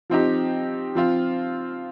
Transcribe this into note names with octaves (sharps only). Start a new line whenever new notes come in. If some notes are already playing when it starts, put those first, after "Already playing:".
F3 C4 D#4 G4
F3 C4 F4